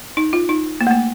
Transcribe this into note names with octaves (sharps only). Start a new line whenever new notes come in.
D#4
F4
D#4
A#3
A3
A#3